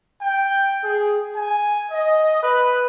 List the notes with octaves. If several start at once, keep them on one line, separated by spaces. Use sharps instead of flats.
G5
G#4
G#5
D#5
B4